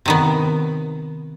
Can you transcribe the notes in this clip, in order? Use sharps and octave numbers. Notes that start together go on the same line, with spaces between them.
C3 D#3 B3